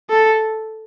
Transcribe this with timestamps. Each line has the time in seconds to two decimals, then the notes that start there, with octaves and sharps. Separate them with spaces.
0.10 A4